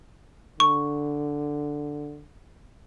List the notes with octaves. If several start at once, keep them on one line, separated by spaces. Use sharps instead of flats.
D3 C#6